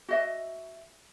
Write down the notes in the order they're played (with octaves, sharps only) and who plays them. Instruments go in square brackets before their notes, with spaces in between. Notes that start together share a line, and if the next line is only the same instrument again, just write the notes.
[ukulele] F#4 D#5 E5